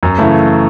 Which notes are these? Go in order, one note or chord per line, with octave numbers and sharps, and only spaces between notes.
F#2
C#3 E3 A3 E4